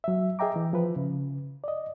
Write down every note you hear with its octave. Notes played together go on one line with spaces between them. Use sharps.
F#3 E5
G#4 D#5 E5 G5 A#5 D6
E3
F3 B4
C#3
D5 D#5